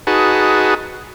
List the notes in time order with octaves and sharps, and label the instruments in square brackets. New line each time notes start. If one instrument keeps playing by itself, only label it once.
[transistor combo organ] D#4 F#4 G#4 B4 F#5 A5